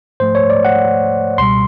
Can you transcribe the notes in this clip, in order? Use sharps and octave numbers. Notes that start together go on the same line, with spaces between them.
G#2 F3 A3 C5
C#5
D5
F#5
C#2 B2 G3 C6